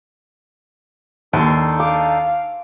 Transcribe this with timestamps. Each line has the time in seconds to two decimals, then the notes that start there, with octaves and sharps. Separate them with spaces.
1.33 D#2 D4 D#4 A4 A5 C6
1.80 F5 D6